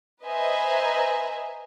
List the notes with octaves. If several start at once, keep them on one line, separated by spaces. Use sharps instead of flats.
B4 C5 D#5 E5 G#5 A#5